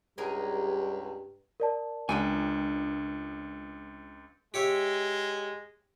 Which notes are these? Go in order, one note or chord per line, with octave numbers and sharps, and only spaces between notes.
C#2 G2 G3 G#4 A#4 A#5
A#4 D5 A5
C#2 D4 G5 G#5
G#3 G4 C#5 E5